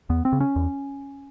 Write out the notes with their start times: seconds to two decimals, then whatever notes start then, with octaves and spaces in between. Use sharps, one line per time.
0.10 E2 B3
0.25 C4
0.32 C#3
0.40 C#4
0.56 E2